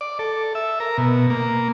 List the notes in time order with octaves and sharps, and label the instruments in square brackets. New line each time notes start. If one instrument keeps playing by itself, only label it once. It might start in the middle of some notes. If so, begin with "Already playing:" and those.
[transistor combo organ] D5
A4
E5
A#4
B2
A#3